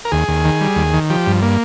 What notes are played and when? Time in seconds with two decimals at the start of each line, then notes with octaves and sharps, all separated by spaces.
0.05 A#4
0.11 D#2 G#4
0.28 D#2
0.45 D#3
0.61 G3
0.76 D#2
0.94 D#3
1.10 F3 G4
1.26 G2
1.42 A#3